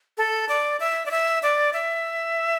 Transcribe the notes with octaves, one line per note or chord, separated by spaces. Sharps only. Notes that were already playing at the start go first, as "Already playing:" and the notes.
A4
D5
E5
D5
E5
D5
E5